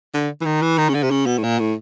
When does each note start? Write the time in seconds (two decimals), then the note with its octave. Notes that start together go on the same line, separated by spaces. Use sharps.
0.14 D3
0.41 E3
0.45 D#3
0.62 E3
0.78 D#3
0.89 C#3
0.94 D3
1.03 C3
1.11 C#3
1.26 B2
1.38 A2
1.43 A#2
1.59 A2